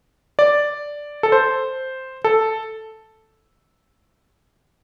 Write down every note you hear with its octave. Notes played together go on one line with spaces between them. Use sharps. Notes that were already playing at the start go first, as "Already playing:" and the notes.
D5
A4
C5
A4